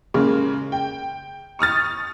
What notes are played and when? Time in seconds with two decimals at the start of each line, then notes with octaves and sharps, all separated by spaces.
0.14 C#3 G#3 A#3
0.72 G5
1.59 C#6 D#6 F6 A6